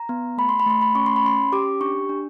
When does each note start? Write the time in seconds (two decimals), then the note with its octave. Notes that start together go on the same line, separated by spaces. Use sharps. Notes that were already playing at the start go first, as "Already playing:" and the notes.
Already playing: A#5
0.09 B3
0.37 A3 B5
0.49 C6
0.60 B5
0.66 A3 C6
0.81 B5
0.95 C#4 C#6
1.06 C6
1.16 B5
1.24 C#4 C6
1.52 G4 D6
1.81 D4 C#6
2.09 D4